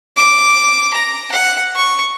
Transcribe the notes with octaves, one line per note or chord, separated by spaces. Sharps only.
D6
A#5
F#5
C#6